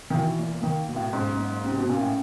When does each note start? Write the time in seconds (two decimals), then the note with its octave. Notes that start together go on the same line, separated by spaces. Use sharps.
0.10 D#3
0.14 B2 E3
0.39 A#3
0.63 D#3 A#3
0.88 B2
0.96 A2
1.13 G#2 C#4
1.38 A#3
1.63 C3 C#4
1.78 B2
1.87 A#2 C#4
2.01 A2